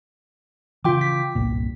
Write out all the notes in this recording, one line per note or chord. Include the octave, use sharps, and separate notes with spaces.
C#3 E3 F4 G5 D6
B6
G1 C2 A#2